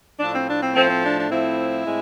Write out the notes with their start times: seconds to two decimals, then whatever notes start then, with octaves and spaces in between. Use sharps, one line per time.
0.20 A2 F3 A3 D4
0.34 C4
0.48 D4
0.61 C4
0.75 A2 F3 A3 C4
0.89 C4
1.03 D4
1.17 D4
1.30 A2 F3 A3 C4 E4
1.86 A2 G#3 C4